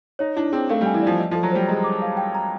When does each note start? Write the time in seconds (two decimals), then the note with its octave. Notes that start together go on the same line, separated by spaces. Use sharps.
0.19 D#4 C#5
0.36 D4 E4
0.52 C4 G#4
0.69 A3 F5
0.81 G3
0.86 G#5
0.94 E3
1.02 F3 D5
1.18 D#5
1.31 F3
1.35 A4
1.43 F#3
1.52 G3 C5
1.68 G#3 A#5
1.84 D6
2.02 F5
2.17 G5
2.35 A#5